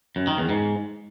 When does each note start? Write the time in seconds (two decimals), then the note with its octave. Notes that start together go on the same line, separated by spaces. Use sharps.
0.16 F#2
0.27 D#3
0.38 E2
0.49 G#2